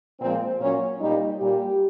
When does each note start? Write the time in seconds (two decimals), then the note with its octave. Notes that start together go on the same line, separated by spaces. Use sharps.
0.20 A#2 F3 G#3 C4
0.60 A#2 F#3 C#4
1.00 A#2 G3 D#4
1.39 A#2 G3 G4